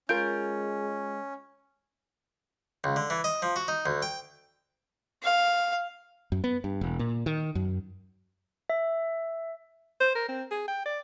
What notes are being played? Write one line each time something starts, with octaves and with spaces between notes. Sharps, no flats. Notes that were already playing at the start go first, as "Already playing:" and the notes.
G#3 C#4 F4 A#4 G6 D7
C#2
D3
E3
D#5
F3
F#4
D#4
D2
G5
F5
F#2
B3
G2
E1
A#2
D#3
F#2
E5
C5
A#4
C4
G#4
G5
D5